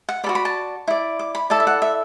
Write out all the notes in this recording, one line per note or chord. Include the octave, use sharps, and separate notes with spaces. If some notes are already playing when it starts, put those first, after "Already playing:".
F#5
A4 D5 B5
F#4
B5
A5
E4 D5
D6
B5
E4 A4 D5 A5
E5
F#5
E5